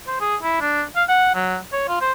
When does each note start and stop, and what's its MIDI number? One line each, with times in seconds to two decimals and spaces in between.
0.07 0.19 72
0.21 0.36 68
0.42 0.61 64
0.61 0.83 62
0.96 1.04 77
1.09 1.32 78
1.35 1.58 54
1.73 1.84 73
1.88 1.99 65
2.01 2.12 72